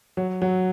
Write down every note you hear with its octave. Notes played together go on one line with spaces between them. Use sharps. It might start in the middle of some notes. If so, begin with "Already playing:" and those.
F#3
F#3